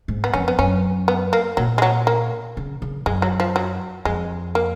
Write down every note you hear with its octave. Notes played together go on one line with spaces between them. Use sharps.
G#2
B3
F2 C#4
B3
F#2 C#4
B3
A#3
A#2 F#3
G#3
F#3
A#3
C#3
C#3
F#2 G#3
F#3
F3
F#3
F2 G#3
A#3